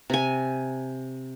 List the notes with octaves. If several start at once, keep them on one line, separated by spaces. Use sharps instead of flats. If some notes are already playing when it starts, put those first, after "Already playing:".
C3 G#5